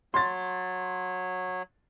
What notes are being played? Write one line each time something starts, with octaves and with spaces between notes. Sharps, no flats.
F#3 C#5 C6 A6